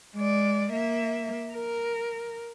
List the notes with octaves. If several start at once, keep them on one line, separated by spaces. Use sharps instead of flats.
G#3 D5
A#3 E5
A#4